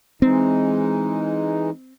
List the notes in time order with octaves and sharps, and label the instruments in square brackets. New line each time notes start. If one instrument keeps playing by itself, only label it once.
[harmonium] E3 G#3 D#4 [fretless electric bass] C4